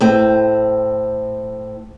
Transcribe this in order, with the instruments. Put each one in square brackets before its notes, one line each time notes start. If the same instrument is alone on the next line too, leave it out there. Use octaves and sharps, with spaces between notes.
[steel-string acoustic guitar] A2 C4